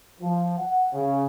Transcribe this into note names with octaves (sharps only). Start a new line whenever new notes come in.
F3
F#5
C#3